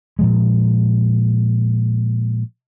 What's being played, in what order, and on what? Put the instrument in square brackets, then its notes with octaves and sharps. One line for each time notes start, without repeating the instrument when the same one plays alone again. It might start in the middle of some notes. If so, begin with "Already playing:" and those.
[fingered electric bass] A#2 F3 G#3